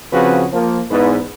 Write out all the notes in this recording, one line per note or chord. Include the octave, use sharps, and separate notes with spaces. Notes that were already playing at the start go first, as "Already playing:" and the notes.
C#3 F3 C4 F#4 G#4 B4
F3 A#3
E2 G#2 B4